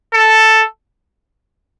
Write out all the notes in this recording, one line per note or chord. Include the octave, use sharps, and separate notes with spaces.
A4